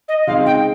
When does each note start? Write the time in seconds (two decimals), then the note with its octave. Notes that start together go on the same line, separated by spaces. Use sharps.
0.08 D#5
0.27 C#3 G#3 C4 D#4 F5
0.46 G5